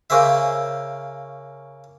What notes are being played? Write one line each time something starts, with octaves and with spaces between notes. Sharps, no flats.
C#3 A#3 C#4 C5 E5